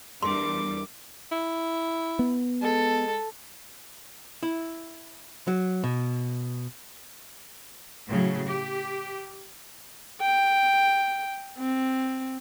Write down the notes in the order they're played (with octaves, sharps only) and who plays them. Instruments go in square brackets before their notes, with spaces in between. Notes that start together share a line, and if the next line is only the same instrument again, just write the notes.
[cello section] E2 G3 [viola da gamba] D4 [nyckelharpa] A#4 D6 [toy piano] C6
[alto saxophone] E4
[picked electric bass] B3
[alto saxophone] G#3 [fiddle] A4
[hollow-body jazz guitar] E4
F#3
B2
[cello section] A2 C#3 F#3
G4
[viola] G5
C4